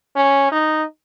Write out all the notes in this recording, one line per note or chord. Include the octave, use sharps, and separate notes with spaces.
C#4
D#4